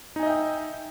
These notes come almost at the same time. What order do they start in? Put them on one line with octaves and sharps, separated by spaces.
D#4 G#5 D#5 E5 G5